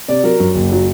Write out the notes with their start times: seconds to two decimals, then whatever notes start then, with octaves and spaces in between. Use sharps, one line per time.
0.08 C3 D5
0.24 F#3 A#4
0.40 F#2
0.56 F#1
0.72 F#3